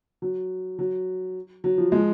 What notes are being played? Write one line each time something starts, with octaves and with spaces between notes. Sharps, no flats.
F#3
F#3
F#3
F3
F3 G#3